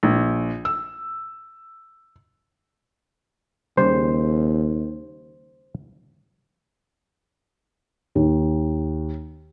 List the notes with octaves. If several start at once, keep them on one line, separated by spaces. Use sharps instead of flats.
A#1
E6
D#2 C#3 G3 C5
D#2